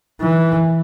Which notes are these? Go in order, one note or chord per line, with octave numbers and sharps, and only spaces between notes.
E3